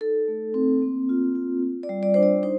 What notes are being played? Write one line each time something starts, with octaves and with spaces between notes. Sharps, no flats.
D#4 A4
A3
C4
A#3
F4
F4
F4
D5
G3
D5
D4 C5
D5
D#4 C5